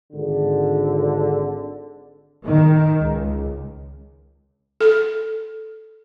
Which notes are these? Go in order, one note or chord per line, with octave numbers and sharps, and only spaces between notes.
G#1 D3
D#3
C#2
A4